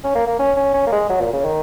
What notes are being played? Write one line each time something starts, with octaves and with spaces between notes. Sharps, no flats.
C#4
A#3
A#3
C#4
C#4
C#4
A#3
G#3
F#3
A#2
C#3
D#3